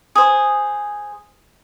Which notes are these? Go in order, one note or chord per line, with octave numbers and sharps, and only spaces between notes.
G#4 C5